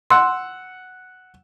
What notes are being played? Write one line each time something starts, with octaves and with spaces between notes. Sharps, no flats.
F#5 C6 E6